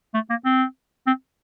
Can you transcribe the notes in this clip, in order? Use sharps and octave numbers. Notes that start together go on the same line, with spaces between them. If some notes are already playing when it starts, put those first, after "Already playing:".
A3
A#3
C4
C4